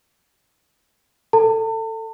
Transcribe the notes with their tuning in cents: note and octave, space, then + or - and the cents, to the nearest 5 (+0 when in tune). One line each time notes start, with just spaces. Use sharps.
A4 +15 A5 +40